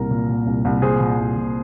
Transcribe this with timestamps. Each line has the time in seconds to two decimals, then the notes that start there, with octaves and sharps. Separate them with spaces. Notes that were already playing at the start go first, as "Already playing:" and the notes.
Already playing: C2 A#2 A#4
0.11 A#2
0.29 A#2
0.46 C2
0.65 C2
0.82 A#2 G#4 C5
1.00 A#2
1.19 C2
1.37 A#2